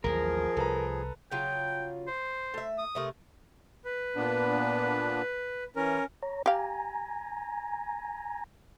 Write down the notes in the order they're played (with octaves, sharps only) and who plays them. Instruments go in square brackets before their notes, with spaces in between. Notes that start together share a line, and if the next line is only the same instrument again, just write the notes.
[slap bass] A1 D#2 F#3 [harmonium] F3 G#4 [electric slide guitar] A#4
[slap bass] C2 [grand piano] A4 B4 A#5
[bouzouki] C#3 F#3 F4 [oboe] G5
[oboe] C5
[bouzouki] A3 E5
[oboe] D#6
[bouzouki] C3 A3 A#4
[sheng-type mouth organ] B4
[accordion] A#2 B3 D4
[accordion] E3 [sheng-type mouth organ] C#4 A#4
[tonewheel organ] C#5 A#5
[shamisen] G4 F5 [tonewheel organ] G#5 A#5